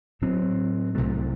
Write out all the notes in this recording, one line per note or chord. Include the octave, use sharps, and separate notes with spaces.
A2 F#3 C4
C2 C3 F#3 A3